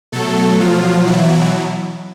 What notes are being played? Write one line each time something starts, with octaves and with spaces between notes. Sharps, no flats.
B2 F#3 A3 A4
F3 F4
E3 E4